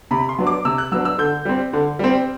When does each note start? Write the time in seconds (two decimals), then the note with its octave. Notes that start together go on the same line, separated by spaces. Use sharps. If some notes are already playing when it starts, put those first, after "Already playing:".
0.11 C3 B5
0.29 C6
0.38 F#3 B3 D4
0.47 D6
0.65 C3 E6
0.78 F#6
0.92 F#3 B3 D4 E6
1.05 E6
1.18 D3 G6
1.45 G3 C4
1.73 D3
1.99 G3 C4